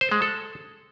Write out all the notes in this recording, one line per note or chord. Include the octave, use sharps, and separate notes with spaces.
C5
G#3
A4